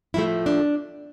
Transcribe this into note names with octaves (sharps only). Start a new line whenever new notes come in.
A2 F3 A3 E4
D4